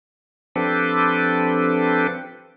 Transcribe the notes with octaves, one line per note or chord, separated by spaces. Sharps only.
F3 C4 D4 G4 A4 B4